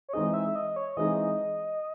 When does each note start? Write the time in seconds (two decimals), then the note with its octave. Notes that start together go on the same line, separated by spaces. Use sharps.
0.09 C#5
0.13 E3 G#3 C4 D#4 G#4 D#5
0.33 E5
0.55 D#5
0.76 C#5
0.97 E3 G#3 C4 D#4 G#4 D#5